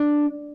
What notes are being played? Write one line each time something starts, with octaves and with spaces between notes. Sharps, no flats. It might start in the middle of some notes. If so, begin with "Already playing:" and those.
Already playing: D4